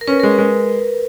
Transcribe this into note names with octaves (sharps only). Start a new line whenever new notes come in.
A#4
C#4 B4
G#3 A#4
B4
G#3